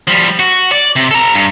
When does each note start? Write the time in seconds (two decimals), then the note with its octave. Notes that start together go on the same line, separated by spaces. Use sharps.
0.08 F3 G3
0.39 F#4
0.72 D5
0.96 C3
1.11 A4 A#5
1.35 G2